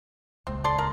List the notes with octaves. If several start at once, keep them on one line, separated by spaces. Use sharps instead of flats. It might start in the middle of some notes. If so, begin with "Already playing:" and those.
D#1 C#2 G#3 C4
A4 D5 C6
A#4